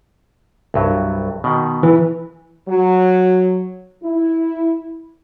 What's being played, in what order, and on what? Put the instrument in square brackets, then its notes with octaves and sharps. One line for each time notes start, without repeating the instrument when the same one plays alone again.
[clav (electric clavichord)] C2 G2 F#3
B2 D#3
[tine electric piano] E3
[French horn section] F#3
E4